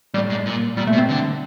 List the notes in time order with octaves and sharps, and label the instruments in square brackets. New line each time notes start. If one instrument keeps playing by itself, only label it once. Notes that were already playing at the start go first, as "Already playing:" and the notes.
[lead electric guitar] A2 [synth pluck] G3
[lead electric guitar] G#2
A#2
[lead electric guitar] A#2 [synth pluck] G3
[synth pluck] A3
[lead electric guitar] B2
[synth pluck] C4
[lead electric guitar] D3